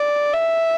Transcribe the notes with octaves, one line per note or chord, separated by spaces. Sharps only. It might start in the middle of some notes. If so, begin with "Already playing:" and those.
Already playing: D5
E5